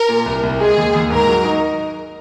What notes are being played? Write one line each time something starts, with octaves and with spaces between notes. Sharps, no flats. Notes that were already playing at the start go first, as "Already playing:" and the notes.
Already playing: A#4
A#2
C2
C2
G#3 G#4
D#2
D#2
G#2 A#4
F#3
D#4